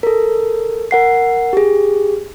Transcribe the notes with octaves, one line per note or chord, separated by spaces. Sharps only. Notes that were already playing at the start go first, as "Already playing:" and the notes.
A4 A#4
A#4 F#5 C7
G4 G#4